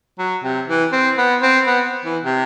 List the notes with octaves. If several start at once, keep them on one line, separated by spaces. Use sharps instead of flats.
F#3
C3
E3
C4
B3
C4
B3
E3
C3